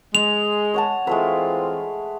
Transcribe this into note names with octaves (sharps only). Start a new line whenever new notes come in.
G#3 F7
C#5 F#5 A5
E3 G#3 A3 C4 F4 B4